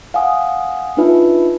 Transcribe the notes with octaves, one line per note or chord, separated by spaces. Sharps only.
F5 F#5 G#5 D#6
D4 D#4 F4 B4 E5 A5